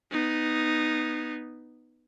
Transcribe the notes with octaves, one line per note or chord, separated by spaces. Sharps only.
B3 D#4